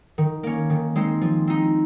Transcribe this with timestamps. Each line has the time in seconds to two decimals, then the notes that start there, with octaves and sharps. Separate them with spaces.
0.18 D#3
0.43 A#3 C#4
0.70 D#3
0.96 G#3 C4 D#4
1.21 F3
1.47 C4 D#4